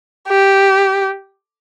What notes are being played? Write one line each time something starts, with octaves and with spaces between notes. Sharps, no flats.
G4